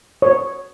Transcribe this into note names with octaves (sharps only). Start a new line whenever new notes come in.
C#5